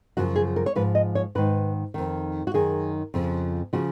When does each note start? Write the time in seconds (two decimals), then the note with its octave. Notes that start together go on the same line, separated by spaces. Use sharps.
0.17 F#2 C#3 F3 F#4
0.36 G#4
0.56 A#4
0.66 C#5
0.75 G#2 F3 B4
0.95 D#5
1.15 C#5
1.35 G#2 D#3 B4
1.94 F2 D#3
2.47 F#4
2.54 F#2 D#3 G#4
3.14 F2 C#3 F3
3.73 C#3 F3 F#4